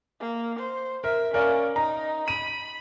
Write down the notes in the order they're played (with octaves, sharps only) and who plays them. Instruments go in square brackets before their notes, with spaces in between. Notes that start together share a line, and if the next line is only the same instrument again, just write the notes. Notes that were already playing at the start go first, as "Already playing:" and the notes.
[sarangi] A#3
C5
[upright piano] A#4 [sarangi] E5
[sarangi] C#4 [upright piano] A#4 D5 F5
[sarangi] D#4 [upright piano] A#5
[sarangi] B5 [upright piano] D#7